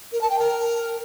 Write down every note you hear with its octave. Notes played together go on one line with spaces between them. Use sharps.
A#4
A5
G5
A#4